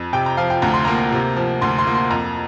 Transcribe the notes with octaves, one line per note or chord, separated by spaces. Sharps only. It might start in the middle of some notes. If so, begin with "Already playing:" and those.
Already playing: F2
C3 G5
A#5
F3 F5
G5
D2 A#5
C6
A#3 A#5
C3
F3
D2 C6
C6
A#3
C6
F2 A#5